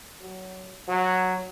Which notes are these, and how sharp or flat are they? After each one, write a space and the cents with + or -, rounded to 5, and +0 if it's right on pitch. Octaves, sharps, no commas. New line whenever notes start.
F#3 +15
F#3 -5